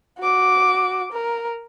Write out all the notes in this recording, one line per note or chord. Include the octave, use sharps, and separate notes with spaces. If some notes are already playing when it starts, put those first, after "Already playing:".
F#4 D6
A#4